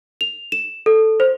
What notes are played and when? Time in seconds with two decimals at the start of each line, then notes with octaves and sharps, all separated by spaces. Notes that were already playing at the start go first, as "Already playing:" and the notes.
0.21 F7
0.52 E7
0.86 A4
1.20 C5